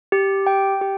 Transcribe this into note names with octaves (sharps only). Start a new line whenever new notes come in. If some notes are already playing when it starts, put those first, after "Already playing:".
G4
G5
G4